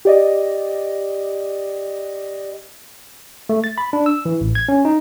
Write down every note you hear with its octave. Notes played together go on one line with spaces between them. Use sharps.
G4 D5 D#5
A3
A6
B5
D4
E6
E3
A1
G#6
C#4
D#4